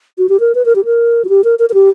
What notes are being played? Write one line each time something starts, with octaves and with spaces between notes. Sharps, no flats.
F#4
G4
A#4
B4
A#4
G4
A#4
F#4
G4
A#4
A#4
A#4
G4